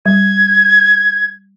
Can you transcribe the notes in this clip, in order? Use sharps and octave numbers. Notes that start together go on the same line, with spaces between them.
G3 G#6